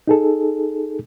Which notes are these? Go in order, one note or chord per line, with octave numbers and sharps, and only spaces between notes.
D#4 G#4 A4